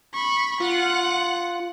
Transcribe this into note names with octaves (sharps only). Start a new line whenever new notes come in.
B5 C#6
F4 F#5